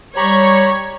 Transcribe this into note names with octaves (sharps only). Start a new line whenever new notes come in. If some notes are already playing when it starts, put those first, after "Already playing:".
G3 G4 C#5 A#5 B5